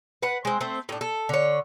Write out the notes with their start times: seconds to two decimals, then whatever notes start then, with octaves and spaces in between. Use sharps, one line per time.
0.22 B4 F#5
0.45 G#3 C4
0.61 A3 C4
0.89 A2 D4
1.01 A4
1.29 D3 C#5